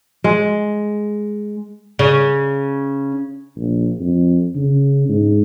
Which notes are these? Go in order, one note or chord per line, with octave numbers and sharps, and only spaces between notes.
G#3
C#3
A#1
F2
C#3
G#2